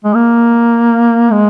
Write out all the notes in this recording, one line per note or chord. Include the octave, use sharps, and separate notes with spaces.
G#3
A#3
G#3